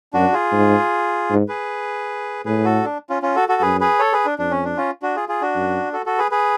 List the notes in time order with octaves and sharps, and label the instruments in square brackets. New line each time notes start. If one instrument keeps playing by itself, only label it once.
[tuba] F#2 [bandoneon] D4 F#4
[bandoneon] F4 G#4
[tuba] G#2
G#2
[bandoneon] G#4 B4
[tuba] A2 [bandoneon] G#4 B4
[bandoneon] F#4 A4
D4
C#4 F4
C#4 F4
F#4 A4
F#4 A4
[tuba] F#2 [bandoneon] G#4 B4
[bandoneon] G#4 B4
A4 C#5
G#4 B4
D4
[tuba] F2 [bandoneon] D4
[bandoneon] C#4
D4
C#4 F4
D4 F#4
F4 G#4
F4 G#4
D4 F#4
[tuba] F#2
[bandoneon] F#4 A4
F#4 A4
G#4 B4
G#4 B4